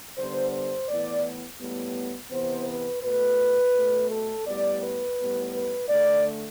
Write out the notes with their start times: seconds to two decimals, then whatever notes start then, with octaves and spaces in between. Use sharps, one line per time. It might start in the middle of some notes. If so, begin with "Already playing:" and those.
0.18 D3 G3 B3 C5
0.53 C5
0.89 A2 E3 B3 D5
1.60 A2 G3 B3
2.32 C3 E3 B3 C5
2.68 B4
3.03 B2 A3 B4
3.75 B2 A3
4.11 A4
4.47 A2 G3 B3 D5
4.83 B4
5.18 A2 G3 B3
5.54 B4
5.89 D3 A3 D5